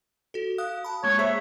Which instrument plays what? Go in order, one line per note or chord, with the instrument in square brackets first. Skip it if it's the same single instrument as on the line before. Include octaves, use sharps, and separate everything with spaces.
[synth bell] F#4 A4
F5 D#6 F#6
A5 B5
[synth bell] G#3 A#3 [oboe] C#5
[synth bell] G#4 C5 A#5 [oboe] E5